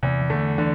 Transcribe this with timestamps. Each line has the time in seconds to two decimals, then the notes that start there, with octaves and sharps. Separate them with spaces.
0.03 E2 C3
0.21 E3
0.30 D3 A3
0.58 D3 E3